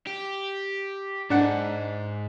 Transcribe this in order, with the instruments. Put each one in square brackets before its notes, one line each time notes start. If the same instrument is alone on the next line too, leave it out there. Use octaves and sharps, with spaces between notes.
[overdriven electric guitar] G4
[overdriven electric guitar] G#2 [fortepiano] D4 F#5